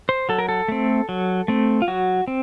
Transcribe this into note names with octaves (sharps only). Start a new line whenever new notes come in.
C5
F#3 A4
A#4
A4
A3 C4
F#3
A3 C4
F4
F#3 F#4
C4